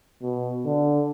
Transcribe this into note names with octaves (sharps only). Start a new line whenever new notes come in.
B2
D3